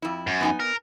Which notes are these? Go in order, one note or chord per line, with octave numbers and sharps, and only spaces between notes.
F2 E4
F#2
B3 D#4 G#5
A#4